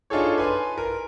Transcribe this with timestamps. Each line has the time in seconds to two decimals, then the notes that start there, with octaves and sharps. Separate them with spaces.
0.10 D4 D#4 F4 G#4 A4 C#5
0.38 B4 G#5 C6
0.78 A#4